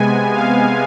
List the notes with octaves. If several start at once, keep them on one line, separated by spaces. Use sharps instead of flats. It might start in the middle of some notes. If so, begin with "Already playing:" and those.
Already playing: C3 G#3 B3 G#5
F5